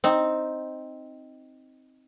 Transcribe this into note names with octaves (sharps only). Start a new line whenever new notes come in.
C4 D#4